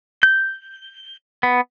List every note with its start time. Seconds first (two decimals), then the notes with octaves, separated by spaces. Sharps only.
0.23 G6
1.43 B3